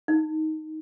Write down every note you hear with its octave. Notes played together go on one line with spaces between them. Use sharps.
D#4